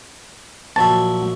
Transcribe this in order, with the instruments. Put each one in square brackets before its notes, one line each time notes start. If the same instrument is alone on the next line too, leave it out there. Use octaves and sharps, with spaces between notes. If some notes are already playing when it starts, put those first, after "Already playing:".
[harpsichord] A#1 F#3 E5 [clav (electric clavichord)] A5